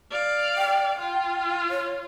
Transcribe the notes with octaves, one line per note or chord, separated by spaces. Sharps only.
D5 F5
G5
F4
C#5